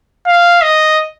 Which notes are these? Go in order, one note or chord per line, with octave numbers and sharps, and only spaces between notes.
F5
D#5